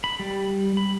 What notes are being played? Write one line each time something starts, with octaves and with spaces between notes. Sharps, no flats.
B5
G3
B5